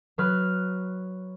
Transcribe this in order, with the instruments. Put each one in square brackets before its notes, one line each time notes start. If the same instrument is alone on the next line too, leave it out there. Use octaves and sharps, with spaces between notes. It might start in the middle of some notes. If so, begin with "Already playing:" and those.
[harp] F#3 B4 F6